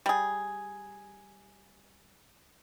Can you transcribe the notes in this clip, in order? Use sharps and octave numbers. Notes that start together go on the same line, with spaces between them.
G3 G#4